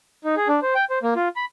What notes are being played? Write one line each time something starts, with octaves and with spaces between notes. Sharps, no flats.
D#4
G#4
D4
C5
G5
C5
A#3
F4
B5